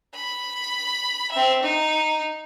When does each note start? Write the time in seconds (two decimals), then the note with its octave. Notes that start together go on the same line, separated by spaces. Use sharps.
0.15 B5
1.32 C4 E5
1.63 D#4